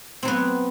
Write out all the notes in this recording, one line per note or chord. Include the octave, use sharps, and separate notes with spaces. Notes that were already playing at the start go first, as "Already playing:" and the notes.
F#3 B3 C4